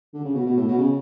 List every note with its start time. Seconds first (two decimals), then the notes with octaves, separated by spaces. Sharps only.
0.14 D3
0.25 C#3
0.34 B2
0.46 B2
0.57 A2
0.67 B2
0.78 C#3